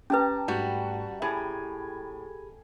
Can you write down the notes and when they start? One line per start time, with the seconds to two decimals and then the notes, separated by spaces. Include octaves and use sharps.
0.10 C#4 G4 B4 A5 A#5
0.48 G#2 G3 A3 F#4
1.22 A2 G4 G#4 G#5 B5